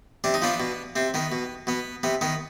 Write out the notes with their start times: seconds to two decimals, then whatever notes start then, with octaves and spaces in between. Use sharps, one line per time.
0.24 C3 D4
0.34 D#4
0.42 F3 B3 D4
0.60 B2
0.96 C3 C4
1.14 D#3 B3
1.32 B2
1.67 B2 B3
2.03 C3 B3
2.21 D#3 B3